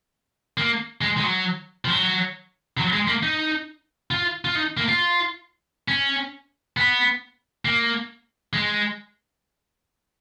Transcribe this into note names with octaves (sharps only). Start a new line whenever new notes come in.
A#3
G#3
G#3
F#3
F3
F#3
F#3
G#3
A#3
D#4
F4
F4
D#4
A#3
F4
C#4
B3
A#3
G#3